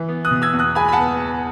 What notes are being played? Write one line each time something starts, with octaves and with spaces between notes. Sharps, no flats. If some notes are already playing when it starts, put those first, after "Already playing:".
Already playing: E3
B3
D#6 F#6
B2
E6 G#6
E2
D#6 F#6
G#3 G#5 B5
B5
F#5 A5
B3